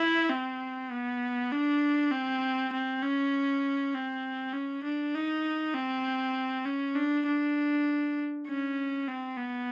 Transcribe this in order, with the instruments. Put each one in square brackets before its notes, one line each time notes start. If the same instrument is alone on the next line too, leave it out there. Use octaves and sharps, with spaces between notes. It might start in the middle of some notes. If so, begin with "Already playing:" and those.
Already playing: [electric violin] E4
C4
B3
D4
C4
C4
C#4
C4
C#4
D4
D#4
C4
C#4
D4
D4
C#4
C4
B3